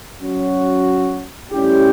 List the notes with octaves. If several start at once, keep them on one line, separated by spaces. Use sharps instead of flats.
F#3 C#4 F#4
A2 G3 C#4 E4 G4